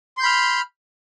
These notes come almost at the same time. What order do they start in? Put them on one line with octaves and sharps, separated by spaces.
C6 G6 B5 F6